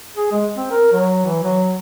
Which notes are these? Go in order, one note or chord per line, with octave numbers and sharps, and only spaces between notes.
G#4
G#3
C4
A#4
F#3
E3
F#3